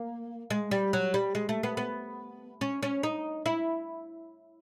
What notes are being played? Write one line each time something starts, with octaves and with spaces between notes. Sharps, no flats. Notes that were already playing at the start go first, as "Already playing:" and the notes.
Already playing: A#3
G#3
G3
F#3
G3
G#3
A3
B3
B3
C#4
C#4
D#4
E4